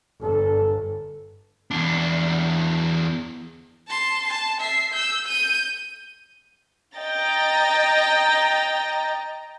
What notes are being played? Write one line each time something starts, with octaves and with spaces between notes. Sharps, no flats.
G1 A4
E2 D4
A5 C6
A5
E5 C7
E6 G6
G6 D#7
D#5 G5 A#5 A6